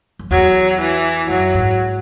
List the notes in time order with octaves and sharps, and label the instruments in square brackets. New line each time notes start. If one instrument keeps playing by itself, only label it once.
[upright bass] F#2
[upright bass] E2 [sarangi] F#3
[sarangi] E3
[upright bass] F#2 [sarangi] F#3
[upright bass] G#2